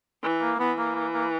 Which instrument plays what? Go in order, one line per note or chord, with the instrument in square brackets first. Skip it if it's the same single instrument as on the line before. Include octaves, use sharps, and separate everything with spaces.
[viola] E3
[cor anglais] A#3
[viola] E3 [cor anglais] B3
[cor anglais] A#3
A#3
A#3